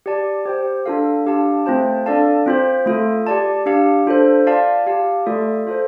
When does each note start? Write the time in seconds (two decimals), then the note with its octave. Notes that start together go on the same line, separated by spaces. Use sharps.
0.06 G4 D5 A5
0.46 G4 C5 G5
0.86 D4 F4 A4 F5
1.26 D4 G4 F5 A5
1.66 A3 C4 F4 C5 A5
2.06 D4 A4 D5 F5 A5
2.46 C4 F4 C5
2.86 A3 F4 A4
3.27 G4 D5 A5
3.66 D4 G4 F5
4.06 D4 F4 A4 C5
4.47 F4 D5 F5 A5
4.86 G4 F5 A5
5.26 A3 F4 A4 D5
5.67 F4 A4 C5